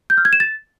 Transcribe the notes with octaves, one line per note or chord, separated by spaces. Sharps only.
G6
F6
G#6
E7
A6